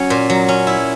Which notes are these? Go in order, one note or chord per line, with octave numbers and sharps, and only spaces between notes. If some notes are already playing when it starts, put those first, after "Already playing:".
Already playing: F#3 C#4
A#2
F#3
C#4
E4